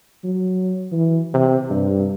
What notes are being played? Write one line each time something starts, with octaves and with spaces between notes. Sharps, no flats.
F#3
E3
C3
G2